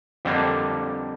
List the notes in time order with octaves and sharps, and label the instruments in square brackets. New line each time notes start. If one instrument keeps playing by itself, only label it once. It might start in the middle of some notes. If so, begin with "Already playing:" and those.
[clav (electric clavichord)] F2 D3 G3 A#3